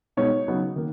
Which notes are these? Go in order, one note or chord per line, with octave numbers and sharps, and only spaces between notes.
B2 G#3 B3 D#4 C#5
C#3 F#3 B3 D#4
D#3 A#3